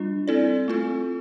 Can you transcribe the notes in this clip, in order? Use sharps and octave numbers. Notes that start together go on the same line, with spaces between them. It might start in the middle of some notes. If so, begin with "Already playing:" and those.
Already playing: G3 D4 F4
C4 E4 A4 D5
A3 C4 F4 A4